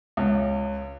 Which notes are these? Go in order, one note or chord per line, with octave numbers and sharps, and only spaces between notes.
C#2